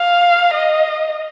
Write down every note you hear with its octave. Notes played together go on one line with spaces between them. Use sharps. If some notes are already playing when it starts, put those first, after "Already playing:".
Already playing: F5
D#5